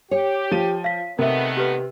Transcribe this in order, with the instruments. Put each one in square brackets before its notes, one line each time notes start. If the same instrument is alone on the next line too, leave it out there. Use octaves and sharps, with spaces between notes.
[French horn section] G4 [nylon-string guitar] C#5
[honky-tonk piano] F3 D#7
[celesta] F5 B6
[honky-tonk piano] C3 [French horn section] D#3 A3 B3 [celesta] A#4 E5
[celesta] G4 B4